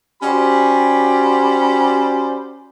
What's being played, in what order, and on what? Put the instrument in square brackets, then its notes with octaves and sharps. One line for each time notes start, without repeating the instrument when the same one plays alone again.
[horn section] C#4 F#4 G4 C5 D5 B5